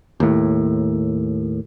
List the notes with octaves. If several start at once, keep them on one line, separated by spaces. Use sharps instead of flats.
D#2 A2